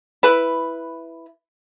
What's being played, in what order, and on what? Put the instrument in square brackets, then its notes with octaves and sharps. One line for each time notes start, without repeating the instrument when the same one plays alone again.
[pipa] E4 B4